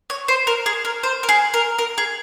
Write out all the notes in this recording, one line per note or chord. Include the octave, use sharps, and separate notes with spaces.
C#5
C5
A#4
G#4
A#4
C5
A#4
G#4
A#4
A#4
G#4